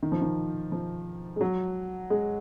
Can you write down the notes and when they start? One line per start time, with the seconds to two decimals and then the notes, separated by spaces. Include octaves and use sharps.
0.03 D#3
0.12 F3
0.21 D#3
0.72 F3
1.36 G#3
1.41 F#3
2.10 G#3